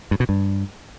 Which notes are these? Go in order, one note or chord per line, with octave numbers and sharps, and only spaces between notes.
G2
B2
G2